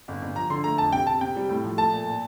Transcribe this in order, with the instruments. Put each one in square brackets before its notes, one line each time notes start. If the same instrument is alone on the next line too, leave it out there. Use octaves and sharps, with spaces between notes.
[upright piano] G1
G1
[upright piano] F3 [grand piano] A#5
[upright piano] D3 [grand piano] C6
[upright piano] A3 [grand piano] A#5
[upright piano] F2 [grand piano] A5
[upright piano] C3 [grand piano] G5
[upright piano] C3 [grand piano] A5
[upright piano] C3 [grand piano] G5
[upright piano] G3
A2
F3
[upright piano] A3 [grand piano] A5
[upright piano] A#2
A#2